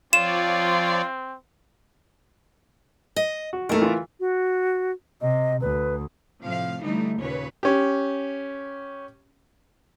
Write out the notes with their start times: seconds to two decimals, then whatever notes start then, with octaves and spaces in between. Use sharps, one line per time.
0.13 F3 C4 F4 C#5 D5 E7
3.16 D#5
3.53 F#4
3.69 D#2 A2 A3 A4 A#4
3.82 E3 F4
4.20 F#4
5.21 C3 D#5
5.61 D2 B4
6.42 A2 C3 F3 A3 F5
6.82 D3 E3 G3 A3 D#4
7.19 D#2 A#2 C#3 B4 C#5
7.63 C#4 G4